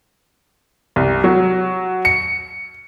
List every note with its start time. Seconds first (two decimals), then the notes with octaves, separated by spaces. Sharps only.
0.96 C2
1.24 F#3
2.05 C#7